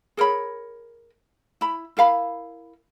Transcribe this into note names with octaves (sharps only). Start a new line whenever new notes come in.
G#4 A#4 C#5 B5
E4 B5
E4 A#4 F5 B5